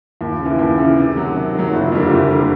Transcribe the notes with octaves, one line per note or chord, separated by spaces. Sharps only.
D#2
C#3
E3
D#2
C#3 E3
C3
D#3 F#3
C3
D#3 F#3
F#1
F2 D3 G3 A#3
F#1
D3 G3 A#3